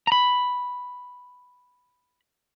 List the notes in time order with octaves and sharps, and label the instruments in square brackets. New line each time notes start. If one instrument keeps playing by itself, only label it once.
[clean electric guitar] A#5 B5